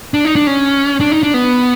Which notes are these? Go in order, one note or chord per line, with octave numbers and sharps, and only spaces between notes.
D4
D#4
D4
C#4
D4
D#4
D4
B3